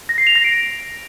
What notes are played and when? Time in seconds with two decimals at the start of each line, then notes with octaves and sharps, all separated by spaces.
0.09 A#6
0.18 C7
0.27 F7
0.35 A#6
0.44 D7